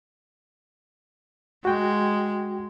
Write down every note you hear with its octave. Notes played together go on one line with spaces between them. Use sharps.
G#3 F#4 G5